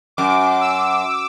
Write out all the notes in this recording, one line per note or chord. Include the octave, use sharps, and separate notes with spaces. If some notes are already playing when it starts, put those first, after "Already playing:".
F#2 D6
E6